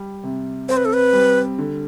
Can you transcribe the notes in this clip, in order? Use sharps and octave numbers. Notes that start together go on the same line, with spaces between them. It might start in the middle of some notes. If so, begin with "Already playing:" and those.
Already playing: G3
C3
C4 C5
B4
A4
B4
G3
D3